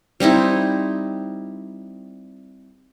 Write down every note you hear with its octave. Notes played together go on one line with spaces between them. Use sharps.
G3 C4 D#4 E4